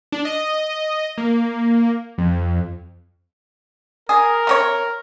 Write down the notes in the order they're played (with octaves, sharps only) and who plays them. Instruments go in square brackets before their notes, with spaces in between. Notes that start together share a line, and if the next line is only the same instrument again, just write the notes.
[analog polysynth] D4
D#5
A#3
F2
[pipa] G#4 [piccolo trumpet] A#4
[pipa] C3 D#4 C#5